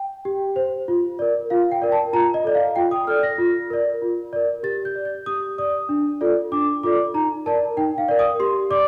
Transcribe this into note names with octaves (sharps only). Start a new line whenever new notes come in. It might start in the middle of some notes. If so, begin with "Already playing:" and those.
Already playing: G5
G4
C5
F4
A#4 D5
F4 F5
G5
A#4 D5
A5
F4 A#5
D#5
A4 D5
F5
F4 G5
D#6
A4 D5 F6
A#6
F4
A#4 D5
F4
A#4 D5
G4 A6
G6
D5
G6
G4 D#6
D5 D#6
D4
F4 A4 D5
D4 D6
F4 A4 D5 D6
D#4 A#5
A#4 D5 A5
D#4 G5
F5
A#4 D5
D#6
G4 C6
D5 D6